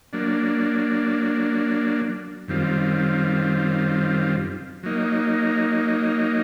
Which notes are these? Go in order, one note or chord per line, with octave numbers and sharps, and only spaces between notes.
F#3 A#3 D4
F#2 D#3 G3 C4 F4
F#3 A#3 D#4